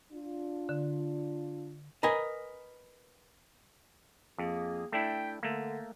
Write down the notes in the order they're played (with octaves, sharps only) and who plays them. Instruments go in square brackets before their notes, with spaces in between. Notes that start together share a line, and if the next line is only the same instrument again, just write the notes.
[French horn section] D4 F4
[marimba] D3
[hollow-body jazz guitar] A#4 B4 D#5 G#5
[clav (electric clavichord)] F2 [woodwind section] A#3 G#4
[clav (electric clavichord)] A3 D4 E4 [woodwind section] G5
[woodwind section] D3 [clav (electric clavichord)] A3 A#3